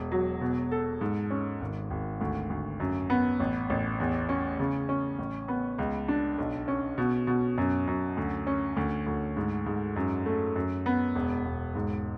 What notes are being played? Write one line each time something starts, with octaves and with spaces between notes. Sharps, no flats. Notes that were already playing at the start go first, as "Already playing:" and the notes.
Already playing: E1
F#3
B2
A4
G#2
C#4
G#1
G#1
D2
D2
F#2
B3
A1
A1
E2
C#4
C#3
C#4
A1
B3
C#2
D4
B1
C#4
B2
B2
F#2
F#2
D2
C#4
D2
D2
G#2
G#2
F#2
A3
F#2
B3
E1
E1
G#2